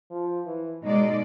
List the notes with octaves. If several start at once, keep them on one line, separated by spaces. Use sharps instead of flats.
F3
E3
B2 G#3 D#4 D5